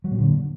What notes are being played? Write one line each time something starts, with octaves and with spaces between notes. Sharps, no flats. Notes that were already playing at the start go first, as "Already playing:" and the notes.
F#3
A#2
D3